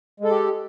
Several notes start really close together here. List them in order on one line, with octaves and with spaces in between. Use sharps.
G#3 A4 G4